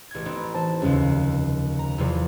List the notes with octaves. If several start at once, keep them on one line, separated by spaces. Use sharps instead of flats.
A1 G#6
B3 C4 D#4
E3 C5 A5
F1 D#2 C#3 G3 C#4
A#5
E2 C3 F3